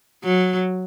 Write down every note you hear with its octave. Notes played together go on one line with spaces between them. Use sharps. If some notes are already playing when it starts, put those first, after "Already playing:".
F#3